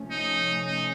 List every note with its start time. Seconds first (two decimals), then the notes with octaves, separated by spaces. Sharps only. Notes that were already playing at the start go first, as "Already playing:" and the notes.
Already playing: C3 F3 A3 C#4
0.11 D#4
0.67 D#4